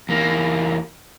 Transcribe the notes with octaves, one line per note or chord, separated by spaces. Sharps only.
E2 A#3